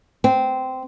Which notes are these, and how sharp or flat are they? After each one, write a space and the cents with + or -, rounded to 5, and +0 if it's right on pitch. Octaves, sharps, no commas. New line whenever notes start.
C4 -15